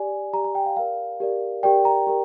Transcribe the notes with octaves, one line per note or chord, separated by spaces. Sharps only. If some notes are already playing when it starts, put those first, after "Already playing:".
Already playing: G4 D5 G#5
G4 D5 A#5
A#5
G5
F5
G4 A#4 D5 F5
G4 A#4 D5
G4 A#4 D5 G5
A#5
G4 A#4